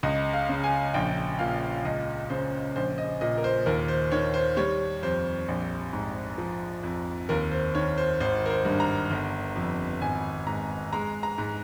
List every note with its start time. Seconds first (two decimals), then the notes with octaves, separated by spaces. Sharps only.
0.03 C#2 D#5
0.33 F5
0.49 C#3
0.64 G#5
0.94 A#1 G5
1.39 A#2 F5
1.85 C#2 D#5
2.30 C#3 C5
2.76 A#1 C5
2.98 D#5
3.21 A#2 D#5
3.37 A#4
3.44 C5
3.66 D#2 A#4
3.88 C5
4.12 D#3 C#5
4.34 C5
4.57 G3 C#5
5.03 F2 C5
5.48 A#1
5.93 G#2
6.38 F3
6.83 F2
7.29 D#2 A#4
7.51 C5
7.75 D#3 C#5
7.98 C5
8.20 G#1 C5
8.46 A#4
8.50 C5
8.65 G2
8.80 A#5
9.11 G1
9.56 F2
10.01 G#1 G#5
10.47 G#2 A#5
10.93 G#3 A#5
11.23 A#5
11.38 G#2